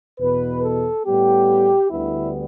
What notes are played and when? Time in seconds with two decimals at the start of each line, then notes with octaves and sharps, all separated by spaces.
0.20 E2 B2 B3 B4
0.63 A4
1.06 A2 G3 B3 G4
1.91 D2 D3 G3 B3 E4